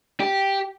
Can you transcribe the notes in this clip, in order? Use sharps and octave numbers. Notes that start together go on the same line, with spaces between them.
G4